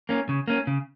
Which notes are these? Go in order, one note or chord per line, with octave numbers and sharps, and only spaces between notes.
A#3 C#4
C#3
A#3 C#4
C#3